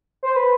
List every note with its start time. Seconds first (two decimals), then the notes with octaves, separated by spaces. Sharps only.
0.23 C5
0.36 B4